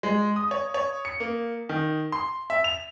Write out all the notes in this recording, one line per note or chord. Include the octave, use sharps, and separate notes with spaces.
G#3
D#6
C#5
C#5
C#7
A#3
D#3
C6
E5
F7